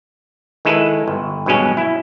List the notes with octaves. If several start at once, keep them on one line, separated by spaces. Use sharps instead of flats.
D#3 G#3 E4 A4 B4
G1
G2 B2 F#3 G#3 C#4
E4